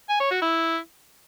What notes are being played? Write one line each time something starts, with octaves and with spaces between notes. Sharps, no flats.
G#5
C#5
F#4
E4